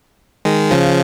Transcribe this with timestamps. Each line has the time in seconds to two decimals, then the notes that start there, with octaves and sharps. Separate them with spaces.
0.45 D#3 G#3
0.71 C#3 F3